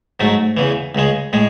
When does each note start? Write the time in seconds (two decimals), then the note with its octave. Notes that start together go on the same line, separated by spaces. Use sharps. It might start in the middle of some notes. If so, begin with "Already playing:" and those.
0.20 G#2 F#3 A3
0.57 E2 C#3 E3
0.95 C#2 C#3 G#3
1.33 A2 G#3